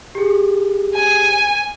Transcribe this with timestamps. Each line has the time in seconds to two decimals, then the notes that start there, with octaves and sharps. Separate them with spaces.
0.15 G4 G#4
0.95 G#5